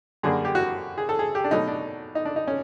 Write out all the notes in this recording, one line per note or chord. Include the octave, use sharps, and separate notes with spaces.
F#2 D3 G3 A#3 G#4
G4
F#4
G#4
A4
G#4
G4
D4
B2 F#3 A3 D#4
D4
D#4
D4
D#4
C#4